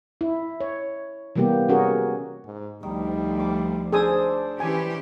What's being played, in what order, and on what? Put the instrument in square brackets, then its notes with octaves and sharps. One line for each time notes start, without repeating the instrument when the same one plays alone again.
[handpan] E4
C#5
C3 E3 G3 A#3 B3 G4
C#4 F#4 G#4 A#4
[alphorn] G#2
[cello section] D2 F3 [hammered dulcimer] D#3 [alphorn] G3
[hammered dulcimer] D6
[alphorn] D4 [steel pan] G#4 G#5 D#6 [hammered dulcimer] A4 C5 D5
[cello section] E3 C#4 G4 [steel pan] G#5